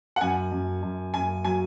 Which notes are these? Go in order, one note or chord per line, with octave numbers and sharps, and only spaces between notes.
F#5
F#2 G#5
F#2
F#2
F#2 G#5
F#3 G#5